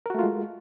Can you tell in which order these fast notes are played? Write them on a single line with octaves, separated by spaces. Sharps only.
A#4 F#4 A3 F4 G#3